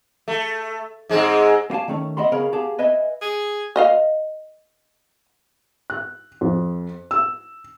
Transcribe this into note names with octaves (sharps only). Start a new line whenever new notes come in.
A3
G#2 G#3 C4
B3 G4 F5 G#5 A5
D#3 A3 C#4
D#5 E5 F#5 B5 C6
C#3 B3 A#4 C#5 F5 B5
B3 G4 G#4 F5 A5
B4 D#5 E5 G#5
G#4
B4 D#5 F5
F#6
F2
E6